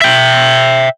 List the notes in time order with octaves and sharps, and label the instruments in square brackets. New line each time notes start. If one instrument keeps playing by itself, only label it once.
[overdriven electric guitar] E5 G5